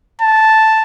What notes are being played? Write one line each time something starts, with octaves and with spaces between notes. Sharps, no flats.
A5